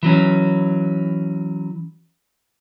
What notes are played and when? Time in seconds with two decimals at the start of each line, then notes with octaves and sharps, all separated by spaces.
0.03 E3 F#3 C#4